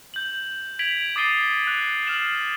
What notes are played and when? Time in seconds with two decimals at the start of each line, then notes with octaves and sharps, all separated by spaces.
0.14 G6 F#7
0.79 G#6 B6 D7 F7 F#7
1.16 D6 D#6 A6 C7 D#7 G7
1.67 F#6
2.06 F6 C7 E7 F#7